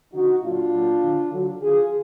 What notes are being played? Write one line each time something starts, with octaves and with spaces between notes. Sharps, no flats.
D3 F3 D#4 F#4
A#2 F#3 D4 F4
A#2 F#3
D3 F3
D3 F#3
D3 F3 F4 G#4